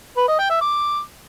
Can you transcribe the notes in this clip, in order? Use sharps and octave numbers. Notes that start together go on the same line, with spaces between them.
B4
D#5
G5
E5
D6